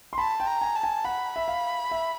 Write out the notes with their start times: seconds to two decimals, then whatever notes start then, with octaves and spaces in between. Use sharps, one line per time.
0.13 C6
0.18 A5 B5
0.40 G5
0.47 A#5
0.61 G#5
0.76 A5
0.83 G#5
1.05 F#5 B5
1.36 E5
1.48 F5
1.91 E5